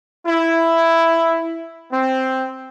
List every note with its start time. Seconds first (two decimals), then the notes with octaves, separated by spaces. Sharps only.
0.25 E4
1.92 C4